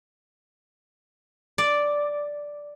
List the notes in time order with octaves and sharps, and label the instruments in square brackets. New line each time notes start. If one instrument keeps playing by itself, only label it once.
[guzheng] D5